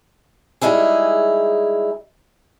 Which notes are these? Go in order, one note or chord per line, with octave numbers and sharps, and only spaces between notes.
G3 G#3 D#4 E4 G#4